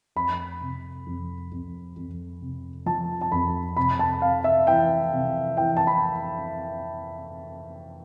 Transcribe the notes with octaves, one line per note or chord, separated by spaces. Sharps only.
F2 B5
C3
F2
F2
F2
C3
F3 A5
A5
F2 B5
C3 B5
A5
C3 F5
E5
E3 G5
C3
E3 G5
A5
B5